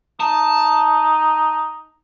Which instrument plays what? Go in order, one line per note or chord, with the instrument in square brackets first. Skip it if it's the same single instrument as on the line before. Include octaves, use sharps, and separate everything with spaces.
[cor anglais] D#4 [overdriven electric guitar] A5